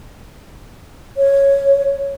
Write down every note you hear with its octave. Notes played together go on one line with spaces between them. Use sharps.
C#5